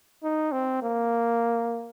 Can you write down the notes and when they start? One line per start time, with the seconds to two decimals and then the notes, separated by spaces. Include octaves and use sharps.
0.23 D#4
0.52 C4
0.82 A#3